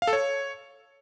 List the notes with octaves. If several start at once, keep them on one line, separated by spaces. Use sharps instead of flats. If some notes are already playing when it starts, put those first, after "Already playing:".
F5
A4
C#5